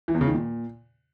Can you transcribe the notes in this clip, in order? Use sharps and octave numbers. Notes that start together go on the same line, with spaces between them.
E3
E2
C#3
D#3
A#2